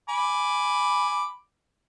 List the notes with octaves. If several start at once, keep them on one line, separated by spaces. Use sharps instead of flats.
G#5 B5 D6